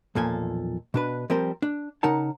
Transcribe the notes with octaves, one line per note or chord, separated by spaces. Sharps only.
B1 E2 A#2 F3 A4 G#5
B2 D4 B4
F3 G3 C4 A#4 C5
D4
C#3 D#4 A#4 F#5 A5